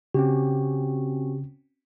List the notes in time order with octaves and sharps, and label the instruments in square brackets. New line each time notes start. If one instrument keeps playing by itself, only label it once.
[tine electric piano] C#3 [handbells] C4 C#4 F#4 [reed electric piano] G4